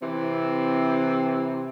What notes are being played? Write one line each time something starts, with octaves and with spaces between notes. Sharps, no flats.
C3 E3 C4